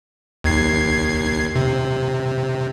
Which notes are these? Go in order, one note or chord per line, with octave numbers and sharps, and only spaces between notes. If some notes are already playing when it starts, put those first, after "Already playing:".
D#2 G#6 C7
C3